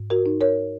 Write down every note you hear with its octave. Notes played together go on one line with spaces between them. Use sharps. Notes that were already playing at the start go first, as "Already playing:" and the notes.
Already playing: G#2
F#4 A#4
D#4
A#4 C#5